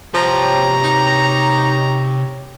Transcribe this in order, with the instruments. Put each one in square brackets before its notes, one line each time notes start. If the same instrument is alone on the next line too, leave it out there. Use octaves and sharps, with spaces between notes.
[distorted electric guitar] C3 B4 [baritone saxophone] F3 [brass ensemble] G4 C#5 [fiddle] A#5
[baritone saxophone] D#4